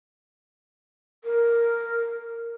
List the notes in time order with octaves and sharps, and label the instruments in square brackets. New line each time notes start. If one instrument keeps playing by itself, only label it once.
[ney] A#4